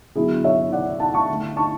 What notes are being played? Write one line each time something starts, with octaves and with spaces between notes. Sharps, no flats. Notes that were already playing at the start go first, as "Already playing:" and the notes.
D3 F#3 B3 E4 G#4
C#5 E5
D5 F#5
F#5 A5
A5 C#6
D3 A3
A5 C#6